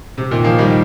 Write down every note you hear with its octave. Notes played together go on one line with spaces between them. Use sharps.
C3
A#2 D#3
F3 A#3
D#3 G3